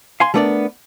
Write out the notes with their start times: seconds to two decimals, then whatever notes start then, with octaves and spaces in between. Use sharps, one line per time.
0.20 F5 G#5 C6
0.34 G3 A3 B3 D4 A#4 D5